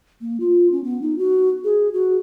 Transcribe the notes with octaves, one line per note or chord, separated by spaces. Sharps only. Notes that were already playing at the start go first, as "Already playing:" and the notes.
A#3
F4
C#4
B3
D#4
F#4
G#4
F#4